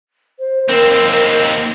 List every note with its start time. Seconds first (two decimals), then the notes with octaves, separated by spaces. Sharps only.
0.39 C5
0.68 D#2 C4 A#4